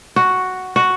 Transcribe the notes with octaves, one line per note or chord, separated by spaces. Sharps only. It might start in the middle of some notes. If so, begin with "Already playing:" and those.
F#4
F#4